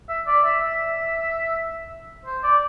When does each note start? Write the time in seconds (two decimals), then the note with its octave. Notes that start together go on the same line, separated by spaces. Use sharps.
0.09 E5
0.27 D5
0.45 E5
0.63 E5
2.25 C5
2.43 D5